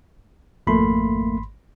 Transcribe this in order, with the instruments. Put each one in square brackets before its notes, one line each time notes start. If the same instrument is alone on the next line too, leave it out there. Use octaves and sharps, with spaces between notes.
[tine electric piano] G#1 B5 C6 [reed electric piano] F2 A3 A#3